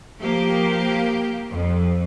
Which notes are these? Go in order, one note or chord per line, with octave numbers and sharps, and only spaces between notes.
F3 A#3 G4
F2